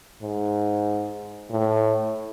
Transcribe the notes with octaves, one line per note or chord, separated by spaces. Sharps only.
G#2
A2